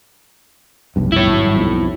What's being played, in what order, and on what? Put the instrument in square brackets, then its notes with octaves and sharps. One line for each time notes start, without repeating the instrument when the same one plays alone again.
[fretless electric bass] F1 B1 G2
[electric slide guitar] E4 C#5
[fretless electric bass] G#1 G2 F#3
B1 F2